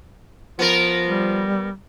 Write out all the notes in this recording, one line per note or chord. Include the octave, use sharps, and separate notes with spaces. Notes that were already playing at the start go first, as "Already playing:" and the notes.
F3 B3 A#4
G3